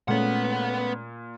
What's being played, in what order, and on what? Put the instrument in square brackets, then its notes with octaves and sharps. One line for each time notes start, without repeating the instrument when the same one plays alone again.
[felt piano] A#2 [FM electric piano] G#3 A3 C#4 [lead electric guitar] B3 F#5